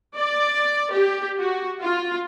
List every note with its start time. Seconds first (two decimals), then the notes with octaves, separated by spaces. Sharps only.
0.16 D5
0.92 G4
1.40 F#4
1.82 F4